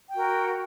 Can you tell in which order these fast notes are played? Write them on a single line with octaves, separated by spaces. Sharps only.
G5 F#4 A#4